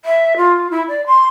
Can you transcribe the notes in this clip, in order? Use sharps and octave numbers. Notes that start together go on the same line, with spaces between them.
E5
F4
E4
D5
C6